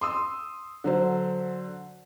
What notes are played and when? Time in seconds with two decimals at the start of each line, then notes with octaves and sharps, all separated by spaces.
0.01 C6 D#6 E6
0.84 D3 F#3 C5